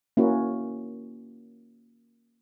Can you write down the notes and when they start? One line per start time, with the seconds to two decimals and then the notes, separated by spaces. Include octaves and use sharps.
0.17 A#3 C#4 E4 F#4